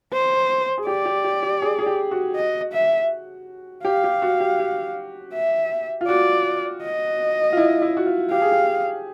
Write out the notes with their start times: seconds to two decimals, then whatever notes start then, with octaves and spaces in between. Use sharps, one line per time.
0.13 C5
0.78 G#4
0.87 G4 D5
1.06 G4
1.24 G4
1.43 G4
1.62 G#4
1.79 G#4
1.86 G4
2.11 F#4
2.36 D#5
2.73 E5
3.85 G4 F5
4.04 G4
4.22 F#4
4.40 G4
4.60 G4
5.34 E5
6.01 F4
6.08 F#4 D5
6.83 D#5
7.52 F4
7.57 E4
7.82 E4
7.97 F#4
8.06 F4
8.31 G4 F5
8.42 G#4
8.52 G4